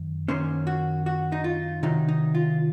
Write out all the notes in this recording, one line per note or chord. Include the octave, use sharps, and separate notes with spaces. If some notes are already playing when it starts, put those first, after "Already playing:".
Already playing: F#2 D#3
F#2 D#3 A#3 C#4 C5
F#4
F#4
D#4
F4
C3 D#3 F#3 D#4
D#4
F4